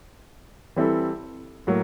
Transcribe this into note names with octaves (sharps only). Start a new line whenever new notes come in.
E3 G3 C4 E4 A4
A2 F#3 A#3